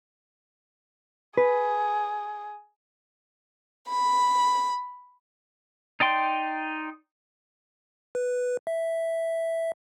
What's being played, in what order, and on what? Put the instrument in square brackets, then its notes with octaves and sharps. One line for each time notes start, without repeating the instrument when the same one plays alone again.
[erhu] G#4 [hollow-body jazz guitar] B4
[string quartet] B5
[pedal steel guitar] D#4 D5 G5 C6
[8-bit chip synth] B4
E5